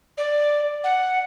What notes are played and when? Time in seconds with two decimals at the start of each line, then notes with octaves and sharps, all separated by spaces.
0.18 D5
0.84 F#5